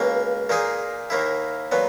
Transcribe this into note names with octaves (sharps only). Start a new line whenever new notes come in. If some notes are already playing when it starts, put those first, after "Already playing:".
Already playing: C#2 B2 A#3
A#2 A#3 D#4 G#4
D#2 D#3 A#3 E4
A#2 F#3 B3